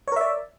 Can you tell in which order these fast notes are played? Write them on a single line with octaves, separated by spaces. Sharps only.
C#5 A#4 E5 D5